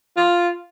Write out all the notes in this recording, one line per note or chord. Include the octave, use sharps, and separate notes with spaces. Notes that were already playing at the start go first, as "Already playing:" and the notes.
F4